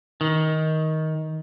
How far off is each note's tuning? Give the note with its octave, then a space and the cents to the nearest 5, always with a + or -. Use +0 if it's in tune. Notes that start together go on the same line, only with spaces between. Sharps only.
D#3 +15